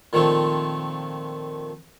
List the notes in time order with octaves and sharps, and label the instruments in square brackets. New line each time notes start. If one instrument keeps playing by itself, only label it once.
[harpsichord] A#2 D#3 F3 A3 C4